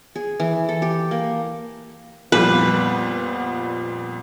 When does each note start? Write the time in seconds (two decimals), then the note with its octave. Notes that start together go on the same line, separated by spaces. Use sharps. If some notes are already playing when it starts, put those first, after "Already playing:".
0.15 G#4
0.40 E3
0.69 A4
0.82 G4
1.11 A#3
2.32 F2 A#2 G3 B3 B4